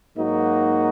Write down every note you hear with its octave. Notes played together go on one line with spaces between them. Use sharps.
G#2 F#3 A#3 D#4 F#4